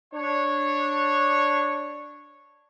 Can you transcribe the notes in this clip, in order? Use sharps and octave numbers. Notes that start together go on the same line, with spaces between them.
D4 C#5